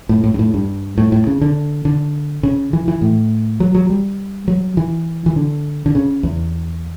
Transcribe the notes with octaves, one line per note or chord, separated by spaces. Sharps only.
A2
A2
G2
A2
G2
A2
A2
C#3
D3
D3
C#3
E3
E3
A2
F#3
F#3
G3
F#3
E3
E3
D3
D3
C#3
E2